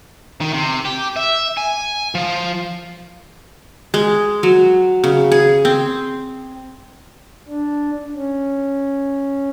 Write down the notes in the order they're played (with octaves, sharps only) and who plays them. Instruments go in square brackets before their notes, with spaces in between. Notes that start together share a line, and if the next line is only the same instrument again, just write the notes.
[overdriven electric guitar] D#3
C3
G4
E5
G#5
F3
[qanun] G#3
F#3
C#3
G#4
C4
[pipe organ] D4
C#4